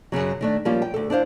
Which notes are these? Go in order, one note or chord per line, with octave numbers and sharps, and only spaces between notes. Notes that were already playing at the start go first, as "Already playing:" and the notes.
F#2 A2 C#3 F#3
D#3 A3 D4
F3 G3 A#3 C#4 F4
G5
D2 A4
D4 E4 C5 F5